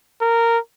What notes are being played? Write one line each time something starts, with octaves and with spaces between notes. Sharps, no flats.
A#4